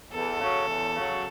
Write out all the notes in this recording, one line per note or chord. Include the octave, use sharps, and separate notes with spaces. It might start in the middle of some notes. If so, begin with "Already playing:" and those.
E2 A4
C#3 F#3
E2
C#3 F#3